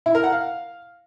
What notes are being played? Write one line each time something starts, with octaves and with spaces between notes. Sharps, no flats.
E4
A#4
F#5
F5